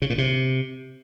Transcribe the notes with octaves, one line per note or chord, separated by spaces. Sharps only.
C#3
A#2
C3